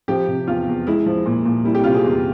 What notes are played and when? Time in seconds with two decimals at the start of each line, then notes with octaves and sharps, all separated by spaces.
0.08 F3 G4
0.28 C3
0.47 E2 F4
0.68 E2
0.87 G#3 E4
1.06 F3
1.26 A#2
1.45 A#2
1.64 G3 E4
1.75 G4
1.84 C3 F4
1.94 G#4
2.03 E2